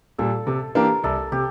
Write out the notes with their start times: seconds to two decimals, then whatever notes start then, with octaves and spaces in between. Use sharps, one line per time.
0.18 A#2 G3 A4
0.47 C3 A4
0.75 E3 A#3 D4 G4 A#4
1.04 C2 A4
1.32 C3 G4